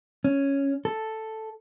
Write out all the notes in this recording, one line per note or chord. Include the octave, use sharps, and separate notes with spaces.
C#4
A4